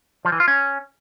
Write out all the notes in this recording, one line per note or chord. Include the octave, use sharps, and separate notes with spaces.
F3
E3
F4
C#4